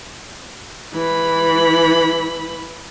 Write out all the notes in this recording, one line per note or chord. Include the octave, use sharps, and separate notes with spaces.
E3 B5